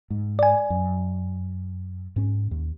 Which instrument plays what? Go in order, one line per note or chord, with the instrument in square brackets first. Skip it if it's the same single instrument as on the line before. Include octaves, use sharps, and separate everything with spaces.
[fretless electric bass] G#2
[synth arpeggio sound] D5 G#5
[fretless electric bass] F#2
G#2 C#4
D#2